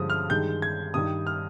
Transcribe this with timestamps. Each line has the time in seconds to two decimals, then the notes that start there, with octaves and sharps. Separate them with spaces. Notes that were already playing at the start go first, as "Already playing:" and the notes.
Already playing: G2 D3 F3 G#3 D#6
0.10 F6
0.30 G2 D#3 G#3 G6
0.62 G#6
0.94 G2 D#3 G3 D#6
1.27 F6